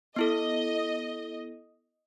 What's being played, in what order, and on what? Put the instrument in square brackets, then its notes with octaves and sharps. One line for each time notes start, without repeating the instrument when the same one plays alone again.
[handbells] B3 E4 A4 [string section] D#5